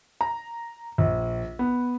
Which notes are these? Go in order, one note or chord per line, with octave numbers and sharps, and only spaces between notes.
A#5
A#1
B3